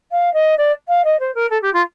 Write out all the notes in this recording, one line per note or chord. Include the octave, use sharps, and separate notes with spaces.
F5
D#5
D5
F5
D#5
C5
A#4
A4
G4
F4